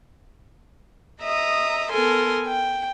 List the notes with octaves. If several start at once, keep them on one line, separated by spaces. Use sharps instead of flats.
D#5 E5 A#5 D#6
B3 A4 A#4 G#5 C6
G5